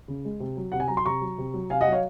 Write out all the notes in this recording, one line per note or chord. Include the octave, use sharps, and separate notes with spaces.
C#3
G#3
C3
F#3
C3 F#5
G#5
F#3 A#5
C6
C3 A#5 C#6
F#3
C3
F#3
C3 F5 G#5
D#5 F#5
F#3
C#5 F5